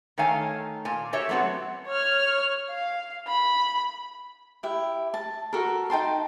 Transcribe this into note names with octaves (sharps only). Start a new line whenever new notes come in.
D#3 A3 C#5 F5 G#5 A#5
A#2 G#5
F#4 G4 A4 C#5 E5
F#3 A3 B3 C4 F#4
C#5 F6
F5
B5
E4 G4 E5
A5
F#4 A4 A#4
D#4 G5 A5 C6